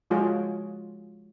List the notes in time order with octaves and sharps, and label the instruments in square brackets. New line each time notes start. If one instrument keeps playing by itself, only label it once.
[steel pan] F3 G#3 F4 F#4 G#4 C#5